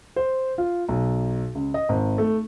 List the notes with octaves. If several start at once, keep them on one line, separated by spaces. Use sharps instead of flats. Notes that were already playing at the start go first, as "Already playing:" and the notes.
C5
F4
B1
C#2
D#5
G#1
A3